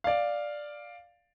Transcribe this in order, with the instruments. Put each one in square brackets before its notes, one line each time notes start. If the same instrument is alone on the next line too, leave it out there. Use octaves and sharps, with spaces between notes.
[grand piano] D5 F5